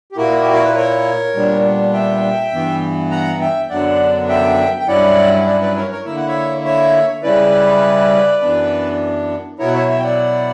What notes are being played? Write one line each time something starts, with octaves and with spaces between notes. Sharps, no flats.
G4
A#2 A#3 E4 F#4 A#4
G4
A#4
B4
A#4 C#5
A#2 G3 B3 D4
E5 G5
G2 E3 B3
F#5 A#5
E5 G5
F#2 D3 F#3 B3 D4 D5 F#5
E5 G5
G5
G2 F#3 C#4 E4 D5 F#5
D5 F#5
B4 D5
A#4 C#5
A#4 C#5
D3 A#3 E4 E5
F#5
C#5 E5
C#5 E5
C#3 G3 C#4 E4 B4 D5
F#2 E3 B3 D4
B2 F#3 B3 E4 A#4 C#5
F#5
C#5 E5
C#5 E5
G5
D5 F#5